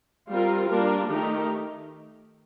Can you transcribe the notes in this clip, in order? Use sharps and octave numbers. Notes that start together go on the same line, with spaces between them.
G3 C4 F4 A#4
G3 A#3 D4 F4 A#4
D#3 A3 D#4 G4 A#4